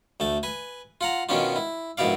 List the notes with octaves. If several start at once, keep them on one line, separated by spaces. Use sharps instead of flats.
D2 A3 A5
B4 G#5
F4 F#5 A#5
B2 D#3 B3 C#4 D4 F4
E4
A#1 G#2 B2 E4 D5 F5